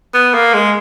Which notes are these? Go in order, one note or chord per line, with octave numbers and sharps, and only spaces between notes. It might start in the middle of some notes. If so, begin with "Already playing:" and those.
B3
A#3
G#3